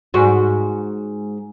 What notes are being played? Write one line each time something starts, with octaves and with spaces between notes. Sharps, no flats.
G#2 F#4